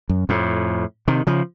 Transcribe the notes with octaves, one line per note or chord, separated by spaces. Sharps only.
F#2
F2 A2
C3 D#3
C#3 F3